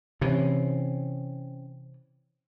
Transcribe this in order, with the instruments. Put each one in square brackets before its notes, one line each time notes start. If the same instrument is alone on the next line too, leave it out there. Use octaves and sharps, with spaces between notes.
[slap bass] C3 E3 [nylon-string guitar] C4 C#4